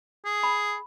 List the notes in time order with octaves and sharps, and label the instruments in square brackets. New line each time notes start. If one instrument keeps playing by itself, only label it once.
[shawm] G#4
[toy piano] B5